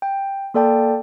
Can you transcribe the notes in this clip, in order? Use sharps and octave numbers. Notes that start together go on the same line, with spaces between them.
G5
A#3 A4 D5 G5 A5